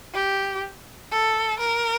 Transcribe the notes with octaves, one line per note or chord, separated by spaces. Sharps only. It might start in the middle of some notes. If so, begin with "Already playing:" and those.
G4
A4
A#4